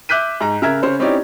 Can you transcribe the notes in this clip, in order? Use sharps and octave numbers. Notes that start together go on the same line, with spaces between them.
E5 D6 F#6 G6 B6 D#7
G#2 A#5
C#3 A#4 E5 A#5 G#6
C#3 C5 C#5
C4 C#4 D#4 E4 G4 D5